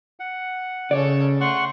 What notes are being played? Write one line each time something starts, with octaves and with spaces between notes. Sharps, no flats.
F#5
C#3 A4 C#5 D5
A3 F#5 C6 C#6 F#6